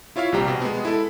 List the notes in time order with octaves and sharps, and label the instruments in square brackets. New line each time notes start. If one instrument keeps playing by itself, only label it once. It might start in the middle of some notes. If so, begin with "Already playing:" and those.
[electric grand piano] E4 F4 C#5 E5 F5
A#1 C3 G3 G4 A#5
B2
G#3 B3
E4 A4